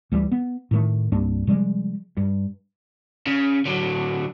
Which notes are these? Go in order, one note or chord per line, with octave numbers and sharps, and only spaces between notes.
D2 E3 G3
B3
A2 D#3 A3
C2 G2 A#3 D4
C3 F3 G3 G#3
G2
C#3
D3 F#3